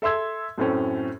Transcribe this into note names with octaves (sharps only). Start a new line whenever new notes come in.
A4 E5 C6 E6 G#6
F#2 A2 A3 C4 C#4